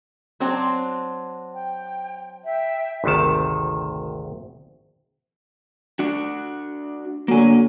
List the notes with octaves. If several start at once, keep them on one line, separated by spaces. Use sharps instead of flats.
F#3 C4 D4
G5
E5 G5
G#1 D2 C3 D#3 A5
D4 F#4
D3 F#3 A#3 G#5